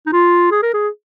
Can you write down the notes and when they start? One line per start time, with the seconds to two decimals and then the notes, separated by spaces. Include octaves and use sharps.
0.06 D#4
0.12 F4
0.51 G#4
0.63 A#4
0.74 G#4